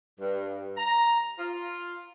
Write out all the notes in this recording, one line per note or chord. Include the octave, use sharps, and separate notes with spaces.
G2
A#5
F4